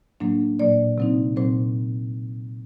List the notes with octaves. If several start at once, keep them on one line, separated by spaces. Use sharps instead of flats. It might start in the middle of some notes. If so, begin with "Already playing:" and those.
A2 F#3 A#3 D4
A#2 F#3 A#3 D5
C3 F#3 C4 D#4
A#2 F#3 C4 C5